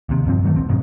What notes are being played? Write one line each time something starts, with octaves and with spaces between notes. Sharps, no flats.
D#2 C3
E1 G2 F3 C4
G2 D#3 F#3 A3
D#1 F2 C4
F2 G#2 B2 F#3